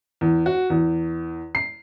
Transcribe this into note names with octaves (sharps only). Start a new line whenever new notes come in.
E2
F#4
E2
C7